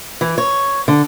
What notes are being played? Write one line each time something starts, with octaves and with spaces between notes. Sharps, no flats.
E3
C#5
D3